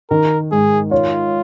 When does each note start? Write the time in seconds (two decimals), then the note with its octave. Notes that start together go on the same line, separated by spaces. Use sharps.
0.10 D#3 A#4
0.51 G#2 G#4
0.91 F4 C#5